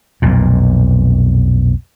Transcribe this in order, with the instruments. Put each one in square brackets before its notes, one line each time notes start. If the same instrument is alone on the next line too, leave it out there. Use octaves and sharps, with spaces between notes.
[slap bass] B1 F2 A#2